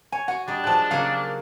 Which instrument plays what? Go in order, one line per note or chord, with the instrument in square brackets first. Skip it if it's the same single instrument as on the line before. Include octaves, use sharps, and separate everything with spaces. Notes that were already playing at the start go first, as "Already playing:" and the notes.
[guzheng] C#5 [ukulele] G#5
[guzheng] F#4 G#5 [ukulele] F#5
[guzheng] G3 D#4 [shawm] D4
[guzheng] F3 G#3 [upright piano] A5 F#6
[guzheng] C#3 F#3 A#3 [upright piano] F5